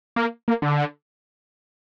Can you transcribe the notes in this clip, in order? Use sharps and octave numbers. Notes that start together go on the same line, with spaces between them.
A#3
A#3
D3